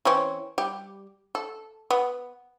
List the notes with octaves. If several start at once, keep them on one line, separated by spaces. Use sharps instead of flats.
E3 C4 C#4
G3 G4
A4
B3